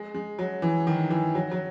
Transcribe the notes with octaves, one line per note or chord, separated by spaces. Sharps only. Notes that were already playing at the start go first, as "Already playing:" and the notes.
Already playing: G#3
G#3
F#3
E3
D#3
E3
F#3
F#3